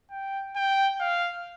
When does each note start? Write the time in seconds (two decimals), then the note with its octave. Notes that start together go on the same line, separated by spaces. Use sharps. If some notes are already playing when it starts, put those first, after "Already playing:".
0.11 G5
0.56 G5
1.00 F5